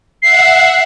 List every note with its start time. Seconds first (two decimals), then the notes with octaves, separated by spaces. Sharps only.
0.22 E5 F#5 C7